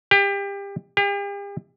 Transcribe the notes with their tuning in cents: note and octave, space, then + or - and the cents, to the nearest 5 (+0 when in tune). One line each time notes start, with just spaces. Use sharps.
G4 +30
G4 +45